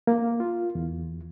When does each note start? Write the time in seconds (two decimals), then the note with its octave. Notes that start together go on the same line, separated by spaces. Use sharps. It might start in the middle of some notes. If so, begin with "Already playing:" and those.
0.07 A#3
0.40 F4
0.75 E2